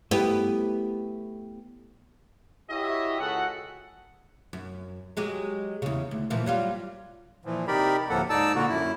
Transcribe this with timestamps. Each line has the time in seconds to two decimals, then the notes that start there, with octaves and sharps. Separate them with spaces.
0.11 A3 B3 E4 G4
2.70 E4 F#4 G4 C#5 D#5 E5
3.19 C#2 F#4 G#4 A4 F#5
4.53 F#2
5.17 F#3 G#3 G4
5.82 E2 C#3
6.11 D2
6.30 A#2 E3 F3
6.46 F#3 G3 F4
7.45 A#2 E3 F3
7.68 C3 D#4 G4 A#4 D5 B5
8.09 D2 A2 F3 A#3 A4 F#5
8.30 G#2 D#4 D5 A5 E6
8.55 A#2 D3 A#3 F#4
8.69 F#2 E4